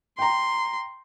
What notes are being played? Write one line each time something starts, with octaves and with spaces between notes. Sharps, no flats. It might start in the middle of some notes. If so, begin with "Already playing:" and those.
G5 A#5 C6